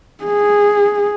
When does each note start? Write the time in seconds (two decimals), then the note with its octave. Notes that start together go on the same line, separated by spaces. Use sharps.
0.24 G#4